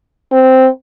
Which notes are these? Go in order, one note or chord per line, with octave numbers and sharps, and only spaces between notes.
C4